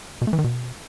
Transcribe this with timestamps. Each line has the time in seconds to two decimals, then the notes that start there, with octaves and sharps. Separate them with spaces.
0.21 B2
0.27 A3
0.33 E3
0.39 D#3
0.44 B2